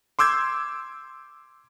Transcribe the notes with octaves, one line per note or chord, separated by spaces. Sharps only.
C6 D6 E6 G6 G#6